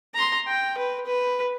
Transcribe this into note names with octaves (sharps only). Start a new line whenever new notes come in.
A#5 C6
G5
B4
B4